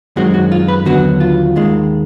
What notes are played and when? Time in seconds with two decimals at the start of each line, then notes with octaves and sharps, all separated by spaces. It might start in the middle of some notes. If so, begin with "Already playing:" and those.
0.16 F#2 D#3 G#3 C4 F#4
0.34 F#4
0.52 F4
0.68 B4
0.85 D#2 D3 F#3 B3 F#4
1.20 F4
1.56 D#2 D#3 G#3